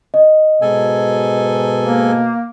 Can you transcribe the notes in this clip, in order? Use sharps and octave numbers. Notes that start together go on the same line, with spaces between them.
D#5
G#2 B2 A4 G#5
A#3